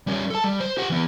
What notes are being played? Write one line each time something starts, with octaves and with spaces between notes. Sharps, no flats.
G3 C#4
A4 A5
G3
C5
G4 F#5
E3 B3